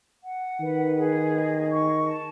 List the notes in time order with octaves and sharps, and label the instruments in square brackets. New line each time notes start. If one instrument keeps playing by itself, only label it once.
[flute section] F#5
[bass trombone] D#3 [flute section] B4
[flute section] G#4
D#5
C#6
A5